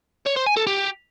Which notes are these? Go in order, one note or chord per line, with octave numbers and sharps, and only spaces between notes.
C#5
C5
G#5
A4
G4